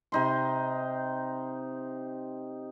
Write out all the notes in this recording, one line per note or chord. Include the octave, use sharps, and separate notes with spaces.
C3 D#4 C6